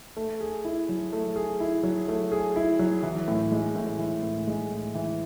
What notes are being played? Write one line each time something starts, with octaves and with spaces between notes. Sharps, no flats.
A3
G#4
E4
F#3
A3
G#4
E4
F#3
A3
G#4
E4
F#3
E3
A2
G#3
A2
E3
A2
G#3
A2
E3